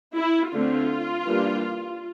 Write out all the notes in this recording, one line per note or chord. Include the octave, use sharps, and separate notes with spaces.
E4
D3 A3 C4 F4
E3 G3 A#3 D4